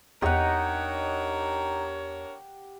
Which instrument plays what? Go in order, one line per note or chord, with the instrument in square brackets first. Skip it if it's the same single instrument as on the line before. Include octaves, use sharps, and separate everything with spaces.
[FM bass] E2 [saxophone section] D4 A#4 C#5 [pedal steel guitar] D#4 D#5 [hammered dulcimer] G4 F#5